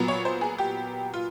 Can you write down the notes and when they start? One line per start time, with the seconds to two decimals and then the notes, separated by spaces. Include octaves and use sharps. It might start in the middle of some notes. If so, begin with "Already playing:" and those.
Already playing: A#2 F#3 B3
0.08 C#5
0.25 C5
0.41 G#4
0.58 G4
1.14 F4